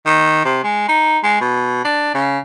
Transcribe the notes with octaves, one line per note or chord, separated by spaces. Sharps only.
D#3
C3
G#3
D#4
G#3
B2
D4
C#3